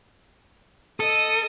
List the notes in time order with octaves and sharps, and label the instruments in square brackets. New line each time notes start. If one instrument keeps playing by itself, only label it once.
[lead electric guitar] A4 [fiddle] D#5 D#6